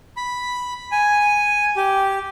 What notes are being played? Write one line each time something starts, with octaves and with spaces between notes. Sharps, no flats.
B5
G#5
G4